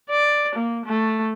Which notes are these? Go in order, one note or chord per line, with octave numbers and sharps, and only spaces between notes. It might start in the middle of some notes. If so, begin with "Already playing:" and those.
D5
A#3
A3